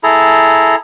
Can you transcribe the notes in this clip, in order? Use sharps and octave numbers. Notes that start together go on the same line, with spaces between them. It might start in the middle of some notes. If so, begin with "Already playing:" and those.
E4 G#4 A4 A#5